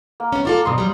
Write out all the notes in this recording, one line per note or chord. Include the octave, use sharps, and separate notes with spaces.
A#3
B3 C#4
E4 F4 A4 D5
D2 G2 B2 C6 D#6
F#3 G3